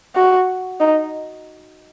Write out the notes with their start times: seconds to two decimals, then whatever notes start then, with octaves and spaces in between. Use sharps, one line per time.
0.15 F#4
0.80 D#4